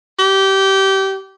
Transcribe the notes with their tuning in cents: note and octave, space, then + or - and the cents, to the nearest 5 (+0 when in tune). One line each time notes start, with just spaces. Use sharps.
G4 -20